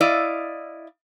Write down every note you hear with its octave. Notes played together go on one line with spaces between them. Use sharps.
E4 D5 D#5 F5